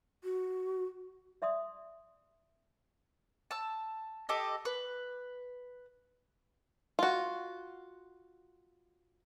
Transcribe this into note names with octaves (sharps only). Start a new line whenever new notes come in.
F#4
D5 E5 C6 D#6
A5 E6
G4 A4 D#5
B4
F4 F#4